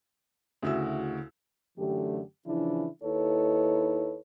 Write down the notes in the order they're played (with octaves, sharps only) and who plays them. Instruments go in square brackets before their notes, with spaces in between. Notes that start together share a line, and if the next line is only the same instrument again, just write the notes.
[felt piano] D2 C#3 E4 F#4 E6
[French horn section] F#2 D3 E3 A3 G4
C#3 E3 F3 D4 E4
D#2 D#4 E4 A4 B4 C#5